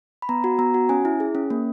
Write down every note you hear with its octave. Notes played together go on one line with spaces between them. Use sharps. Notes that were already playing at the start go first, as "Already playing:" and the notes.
B5
B3 A#5
F#4
B3 A#5
F#4
C#4 G#5
E4
G#4
C#4
A#3